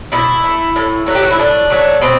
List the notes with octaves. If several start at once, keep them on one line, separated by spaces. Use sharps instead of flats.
B2 E4
A3
A2
F#3 A3
G4
F#4
E4
A2 D4
F#3 A3
B2 C4